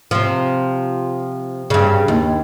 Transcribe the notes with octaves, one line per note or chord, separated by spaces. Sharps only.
C3 F3
G2 C#3
D#2